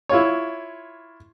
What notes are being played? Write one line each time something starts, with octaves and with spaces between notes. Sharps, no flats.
E4 F4 C#5